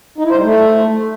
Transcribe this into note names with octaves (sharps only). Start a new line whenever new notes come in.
D#4
E4
C5
G3
A3